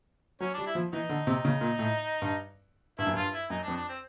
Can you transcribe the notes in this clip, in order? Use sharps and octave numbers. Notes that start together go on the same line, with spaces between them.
F#3 C#4
D4
G3
E4
F3
E3 D#4
D3
C3
C#3
A#2
A2
G2
G2 E4
F#2
G2 F4
E4
F#2 D#4
D4
F2
D4
C4